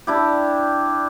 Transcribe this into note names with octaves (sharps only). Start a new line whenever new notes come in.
D4 E4 G4